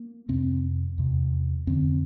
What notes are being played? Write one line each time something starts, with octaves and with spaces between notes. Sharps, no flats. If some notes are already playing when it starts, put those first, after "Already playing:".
Already playing: A#3
F2 C3 C4
E2 C3
F2 D3 C4